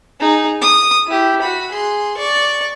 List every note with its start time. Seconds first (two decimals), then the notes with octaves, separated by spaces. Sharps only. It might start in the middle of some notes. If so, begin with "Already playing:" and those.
0.20 D#4 G#4
0.61 D#6
1.07 E4 G4
1.41 F#4 B5
1.72 G#4 C6
2.17 D5 C#6